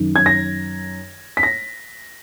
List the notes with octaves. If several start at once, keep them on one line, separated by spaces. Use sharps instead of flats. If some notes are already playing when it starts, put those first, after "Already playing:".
Already playing: F#2 D#3
G#6
A#6
B6
A#6